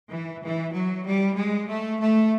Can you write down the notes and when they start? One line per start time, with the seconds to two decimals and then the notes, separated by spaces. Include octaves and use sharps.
0.09 E3
0.42 E3
0.73 F#3
1.04 G3
1.35 G#3
1.68 A3
1.99 A3